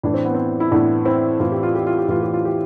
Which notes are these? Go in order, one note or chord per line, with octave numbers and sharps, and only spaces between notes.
A2 E3 D4
C4
B3
C4
E4
A2 E3 B3 D4
C4 E4
A2 E3 F4
G4
F4
G4
F4
G4
A2 E3 F4
G4
F4
G4